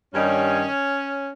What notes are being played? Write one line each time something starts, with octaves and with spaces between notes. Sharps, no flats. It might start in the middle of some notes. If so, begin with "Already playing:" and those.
G2 D#3 G3 C#4